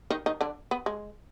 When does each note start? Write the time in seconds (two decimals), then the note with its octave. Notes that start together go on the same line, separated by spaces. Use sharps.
0.10 D#3 D#4
0.26 D#3 D#4
0.41 D3 D4
0.71 B3
0.86 G#3